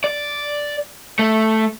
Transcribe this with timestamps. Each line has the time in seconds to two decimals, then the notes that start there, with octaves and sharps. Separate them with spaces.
0.04 D5
1.19 A3